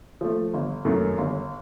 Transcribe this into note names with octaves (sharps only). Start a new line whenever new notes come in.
F3 A3
G1
F#2 D#3 F#3 A3
G1